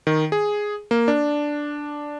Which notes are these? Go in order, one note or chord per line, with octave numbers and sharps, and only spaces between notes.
D#3
G#4
A#3
D4